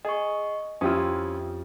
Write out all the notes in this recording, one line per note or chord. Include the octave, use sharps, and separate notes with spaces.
G#4 D#5 C#6
F2 C#4 E4 F4 G4 D#6 E6